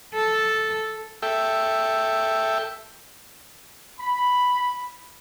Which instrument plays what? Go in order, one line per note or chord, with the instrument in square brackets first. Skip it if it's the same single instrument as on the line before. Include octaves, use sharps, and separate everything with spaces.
[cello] A4
[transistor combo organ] A4 E5 G5
[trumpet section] B5